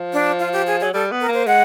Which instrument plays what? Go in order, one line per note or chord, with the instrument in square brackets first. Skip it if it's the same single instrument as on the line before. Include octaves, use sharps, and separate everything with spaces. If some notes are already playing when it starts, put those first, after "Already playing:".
Already playing: [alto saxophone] F3
[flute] D4
F4
G4
G#4
[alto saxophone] F#3 [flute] G#4
[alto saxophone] G3 [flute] A4
[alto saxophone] B3
[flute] A#4
[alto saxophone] A#3
[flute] C5
[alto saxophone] G#3 [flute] F#5